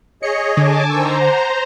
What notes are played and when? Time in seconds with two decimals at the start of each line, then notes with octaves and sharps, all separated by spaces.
0.23 G#4 C#5 D#5 C#7
0.57 D3 G#5 A5 D6
0.90 D#3 C5 A#5 C#6 E6
1.21 F#5